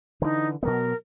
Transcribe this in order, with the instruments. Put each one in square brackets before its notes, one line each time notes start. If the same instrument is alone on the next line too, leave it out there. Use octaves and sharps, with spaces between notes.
[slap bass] D3 E3 [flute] D#4
[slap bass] B2 F#3 B3 [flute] A#4